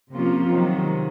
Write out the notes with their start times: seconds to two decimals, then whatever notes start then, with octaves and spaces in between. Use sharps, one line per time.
0.12 C3 F3 A#3 C#4 F4
0.49 C3 D#3 F#3